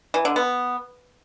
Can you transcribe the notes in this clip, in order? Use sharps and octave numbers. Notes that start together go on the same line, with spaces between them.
E3
D3
B3